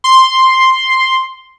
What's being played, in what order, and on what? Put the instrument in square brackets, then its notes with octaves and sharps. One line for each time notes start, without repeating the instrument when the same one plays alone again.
[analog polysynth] C6